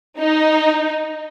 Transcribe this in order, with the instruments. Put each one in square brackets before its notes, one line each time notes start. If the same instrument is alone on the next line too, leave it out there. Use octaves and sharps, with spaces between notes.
[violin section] D#4